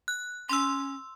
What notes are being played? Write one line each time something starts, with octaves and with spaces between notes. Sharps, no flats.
F#6
C#4 C6 E6